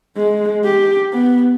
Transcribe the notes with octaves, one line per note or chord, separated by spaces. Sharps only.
G#3
G4
B3